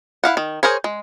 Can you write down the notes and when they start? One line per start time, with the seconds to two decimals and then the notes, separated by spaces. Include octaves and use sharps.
0.24 E4 F5 F#5
0.37 D#3
0.63 G#4 A#4 C5 C#5
0.84 G#3